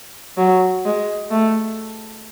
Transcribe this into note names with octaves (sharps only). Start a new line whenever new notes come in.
F#3
G#3
A3